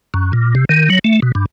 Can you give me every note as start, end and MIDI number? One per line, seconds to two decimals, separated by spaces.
0.14 0.32 42
0.33 0.55 46
0.55 0.65 48
0.69 0.89 51
0.90 0.99 54
1.04 1.20 57
1.22 1.32 47
1.35 1.46 43